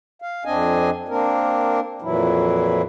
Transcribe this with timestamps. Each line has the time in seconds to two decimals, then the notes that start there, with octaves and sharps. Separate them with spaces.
0.22 F5
0.45 F2 C4 D4 D#5 G#5
1.09 A#3 C4 D4 A#4
2.02 F2 A#2 E3 F#3 E4